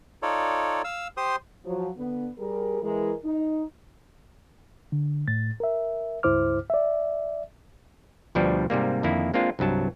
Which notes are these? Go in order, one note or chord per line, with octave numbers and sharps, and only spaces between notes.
D#4 F4 A4 C#5 D5
F5 E6
G4 C5 C6 D#6
F3 F#3
D3 B3
G3 G#4 A#4
E3 G#3 A#4
D#4
D3
A2 A6
A#4 E5
C#2 G2 E4 C5 D6 F6
D5 E5
D2 B2 F3 G3 D4 G4
G#2 C3 G3 A#3
F2 D3 D#3 A#3 E4
G#3 A#3 C4 D4 F4
C2 G2 F#3 A5